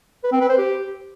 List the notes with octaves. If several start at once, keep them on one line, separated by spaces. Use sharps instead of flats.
B4
C4
B4
C5
G4